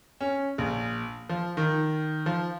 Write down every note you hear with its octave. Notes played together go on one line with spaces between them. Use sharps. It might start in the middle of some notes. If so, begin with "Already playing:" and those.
C#4
A#1
F3
D#3
F3